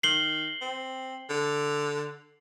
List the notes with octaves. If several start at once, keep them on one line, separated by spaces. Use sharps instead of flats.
D#3 C7 F#7 G7
C4
D3